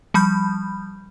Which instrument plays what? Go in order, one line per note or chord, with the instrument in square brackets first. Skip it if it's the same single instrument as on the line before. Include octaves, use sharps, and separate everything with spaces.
[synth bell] F3 G3 B5 G6